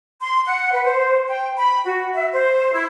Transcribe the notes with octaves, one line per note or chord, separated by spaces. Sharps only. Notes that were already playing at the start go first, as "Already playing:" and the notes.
C6
F#5
B4
C5
G5
B5
F#4
E5
C5
E4